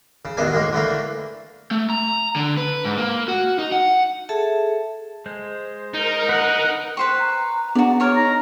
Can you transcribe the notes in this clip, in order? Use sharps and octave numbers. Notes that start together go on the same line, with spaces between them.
C#3
A1 E2 B2 D#3 D4 G#5
A2 G#3 A#3
D3 E3 A3 A#3
A3
A#5
D3
B4
G#2
A#3
F#4
D#4
F#5
G#4 A4 E5 A5
G#3 C5
D#4 A#4
B4 F#5 D#6
B4 C5 G5 C#6
A#5
B3 D4 F#4 G#4 D5
A#4 C#5 A5
D#4 A#5